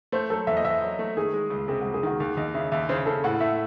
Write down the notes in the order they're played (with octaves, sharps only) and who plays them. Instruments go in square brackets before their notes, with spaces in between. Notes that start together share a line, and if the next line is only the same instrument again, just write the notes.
[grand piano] A3 [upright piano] C5
[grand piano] F#3 [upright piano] A4
[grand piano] E2 [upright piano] E5
[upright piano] D#5
[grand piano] E2 [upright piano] E5
[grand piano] F#3
A3
[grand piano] D#3 [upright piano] G#4
[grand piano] G#3
C#2
[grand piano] C3 [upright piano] G#4
[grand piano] C#2 [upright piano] F#4
[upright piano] G#4
[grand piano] D#3 [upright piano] F#4
[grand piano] D#2 [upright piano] G#4
[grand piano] D#2 [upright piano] D#5
[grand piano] C#3 [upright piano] E5
[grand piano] D#2 [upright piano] E5
[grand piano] C#3 [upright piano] C5
[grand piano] C#3 [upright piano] A4
[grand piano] A2 [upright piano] F#5
[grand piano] A3 [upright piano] E5